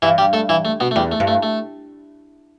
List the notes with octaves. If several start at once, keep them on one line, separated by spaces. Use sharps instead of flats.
G2 E3 E4
G3 G4
A3 A4
E3 E4
A3
B2 B3
A3
E2 G3
A3
G2
A3
A3